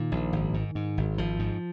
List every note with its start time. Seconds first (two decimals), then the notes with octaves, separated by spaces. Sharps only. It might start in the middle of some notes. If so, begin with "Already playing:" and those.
Already playing: A#2 D#3
0.12 A#1
0.33 G#1
0.54 G#2
0.75 G#2
0.97 G#1
1.18 G#1 F3
1.39 G#2